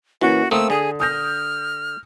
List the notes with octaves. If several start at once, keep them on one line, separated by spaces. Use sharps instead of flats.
E3 A#3 C#4 E4 F#4
A3 A#3 C4 D#6 E6
D3 G#4
D#6 F6 G6 A#6